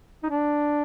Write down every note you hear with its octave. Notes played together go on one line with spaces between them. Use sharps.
D#4
D4